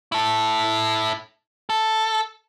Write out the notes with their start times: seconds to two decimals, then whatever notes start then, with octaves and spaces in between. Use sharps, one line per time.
0.12 E4 A4
1.70 A4